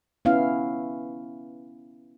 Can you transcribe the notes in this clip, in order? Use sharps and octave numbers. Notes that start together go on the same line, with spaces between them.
B3 C#4 E4 F5